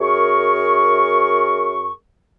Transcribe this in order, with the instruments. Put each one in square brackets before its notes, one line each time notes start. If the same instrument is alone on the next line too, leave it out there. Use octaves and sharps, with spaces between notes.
[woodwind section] F#2 G#4 A#4 C#6